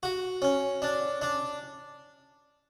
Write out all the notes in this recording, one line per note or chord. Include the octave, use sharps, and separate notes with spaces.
F#4
C#4
D4
D4